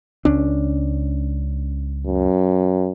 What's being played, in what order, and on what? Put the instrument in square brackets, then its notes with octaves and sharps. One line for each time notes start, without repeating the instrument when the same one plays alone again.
[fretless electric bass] C#2 C#4 D4
[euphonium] F#2